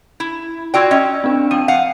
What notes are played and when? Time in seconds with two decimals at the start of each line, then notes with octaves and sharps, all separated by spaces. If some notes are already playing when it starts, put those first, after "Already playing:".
0.20 E4
0.74 F4 F#4 D5 G5 E6 G#6
0.91 C#4 D#5
1.24 C4 D4
1.51 F3 G5 D#7
1.68 F5 F#5